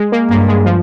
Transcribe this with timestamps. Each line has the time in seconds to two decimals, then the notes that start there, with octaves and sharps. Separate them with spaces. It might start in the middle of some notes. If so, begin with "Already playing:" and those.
Already playing: G#3
0.12 A#3
0.29 G2 A#3
0.48 G#3
0.66 F3